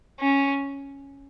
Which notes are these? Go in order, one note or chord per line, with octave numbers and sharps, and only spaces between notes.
C#4